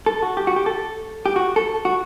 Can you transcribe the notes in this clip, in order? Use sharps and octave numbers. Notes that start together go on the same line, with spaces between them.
A4
F#4
G4
F#4
G4
A4
G4
F#4
A4
F#4